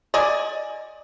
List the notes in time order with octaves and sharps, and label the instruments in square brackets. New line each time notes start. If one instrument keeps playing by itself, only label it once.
[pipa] D5 D#5 G#5